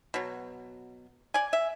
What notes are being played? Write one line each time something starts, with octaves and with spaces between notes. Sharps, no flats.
B2 F#3
D5 G#5
E5